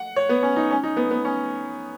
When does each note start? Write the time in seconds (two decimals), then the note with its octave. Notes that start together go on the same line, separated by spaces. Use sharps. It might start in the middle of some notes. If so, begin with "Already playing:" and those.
Already playing: F#5
0.16 C#5
0.29 B3
0.43 C#4
0.56 D#4
0.71 C#4
0.83 D#4
0.97 B3
1.11 B3
1.25 C#4